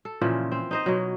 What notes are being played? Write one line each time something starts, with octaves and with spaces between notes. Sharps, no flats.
A4
A#2 C#3 E3 F3
C4
D#4 C5 D#5
B2 F#3